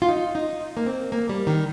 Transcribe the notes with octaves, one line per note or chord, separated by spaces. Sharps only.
F4
D#4
D#4
A#3
C4
A#3
G3
D#3